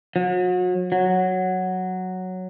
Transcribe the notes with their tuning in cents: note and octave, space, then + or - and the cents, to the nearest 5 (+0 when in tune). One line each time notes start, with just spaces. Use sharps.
F#3 -35
F#3 +0